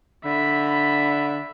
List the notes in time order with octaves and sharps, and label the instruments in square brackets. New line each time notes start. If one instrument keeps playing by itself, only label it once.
[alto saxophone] D3 [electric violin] E5 B5